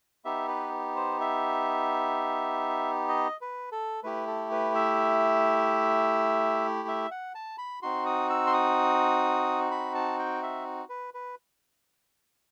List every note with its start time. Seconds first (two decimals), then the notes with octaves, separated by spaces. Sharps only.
0.25 B3 D#4 G4 E5
0.48 B4
0.96 C5
1.20 E5
3.09 D#5
3.41 B4
3.72 A4
4.03 A3 E4 G4 B4
4.27 A4
4.52 B4
4.75 E5
6.88 E5
7.11 F#5
7.35 A5
7.58 B5
7.82 C4 D#4 F#4 C6
8.06 D#6
8.30 E6
8.47 C6
8.53 D#6
9.71 B5
9.95 A5
10.19 G5
10.43 E5
10.89 B4
11.14 B4